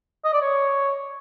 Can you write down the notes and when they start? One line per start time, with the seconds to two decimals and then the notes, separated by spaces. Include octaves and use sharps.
0.24 D#5
0.33 D5
0.42 C#5